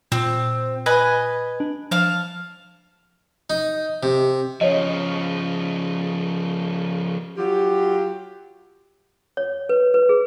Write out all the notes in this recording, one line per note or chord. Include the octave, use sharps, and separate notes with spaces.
A#2 C4
B4 D#5 G#5
D4
F3 F5 A5
D#4
C3
C#3 F3 C#5 D#5
F#3 F4 G4
C#5
B4
B4
G#4